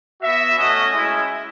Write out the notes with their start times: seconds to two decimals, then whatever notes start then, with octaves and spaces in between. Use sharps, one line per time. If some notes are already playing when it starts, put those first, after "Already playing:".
0.22 B3 F#4 E5
0.57 A3 C#4 F#4 D#5
0.91 G#3 C#4 E4